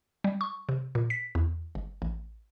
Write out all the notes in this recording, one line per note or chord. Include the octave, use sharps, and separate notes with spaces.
G3
C#6
C3
A#2
B6
E2
G1
A1